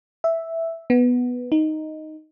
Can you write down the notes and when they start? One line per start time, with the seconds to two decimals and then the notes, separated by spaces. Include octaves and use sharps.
0.24 E5
0.90 B3
1.52 D#4